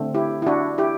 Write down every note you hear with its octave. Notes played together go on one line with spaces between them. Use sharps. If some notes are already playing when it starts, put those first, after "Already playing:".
Already playing: D3 A3 C4
E4 G4
E4
D4 F#4
E4 G4